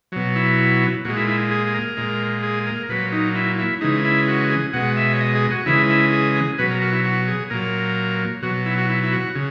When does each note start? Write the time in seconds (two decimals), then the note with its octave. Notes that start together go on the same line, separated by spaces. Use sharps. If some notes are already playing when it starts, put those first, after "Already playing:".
0.12 B2 F#3
0.36 E4
1.05 A#2 G#3 F#4
1.16 E4
1.28 E4
1.51 G#4
1.67 G#4
1.74 A#4
1.97 A#2 G#3
2.43 G#4
2.66 A#4
2.89 A#2 F#3 B4
3.12 D#4
3.36 E4
3.58 E4
3.81 C#3 E3 G#3 D#4
4.05 E4
4.28 F#4
4.50 G#4
4.73 B2 G#3 F#5
4.97 E5
5.12 C#5
5.21 D#5
5.35 G#4
5.51 F#4
5.66 C#3 E3 G#3 E4
5.90 E4
6.13 G#4
6.35 G#4
6.58 B2 F#3 B4
6.71 A#4
6.82 F#4
6.92 E4
7.05 F#4
7.28 G#4
7.50 A#2 F#3 A#4
8.42 B2 F#3 F#4
8.66 E4
8.78 F#4
8.89 E4
9.03 E4
9.13 F#4
9.35 C#3